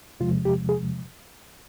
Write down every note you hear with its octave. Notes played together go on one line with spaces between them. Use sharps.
E2 C3 F3 G#3 F4
G4
G#4